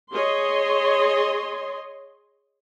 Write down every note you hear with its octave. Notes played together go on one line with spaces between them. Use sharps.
G#4 C#5 D#5 C6